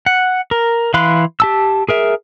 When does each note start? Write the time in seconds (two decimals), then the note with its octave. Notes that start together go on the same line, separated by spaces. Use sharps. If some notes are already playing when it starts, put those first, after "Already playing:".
0.06 F#5
0.51 A#4
0.94 E3 F5 B5 C6 F#6
1.40 G4 A5 E6
1.89 G#4 A#4 E5